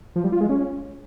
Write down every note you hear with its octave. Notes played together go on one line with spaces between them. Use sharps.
F3
G3
F4
G#3
C#4